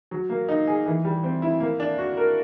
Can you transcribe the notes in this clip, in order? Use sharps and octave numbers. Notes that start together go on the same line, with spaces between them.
F#3
A#3
D#4
G#4
E3
G3
C4
E4
A#3
D4
F#4
A#4